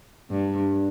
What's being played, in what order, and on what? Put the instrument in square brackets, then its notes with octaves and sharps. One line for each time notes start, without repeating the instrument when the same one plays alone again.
[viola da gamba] G2